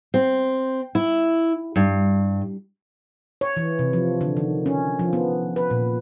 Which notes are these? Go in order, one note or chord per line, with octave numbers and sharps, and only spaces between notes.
C4
E4
G2
C#5
E3
C3
F3
D3
D#3
C#4
F3
B3
B4
A#2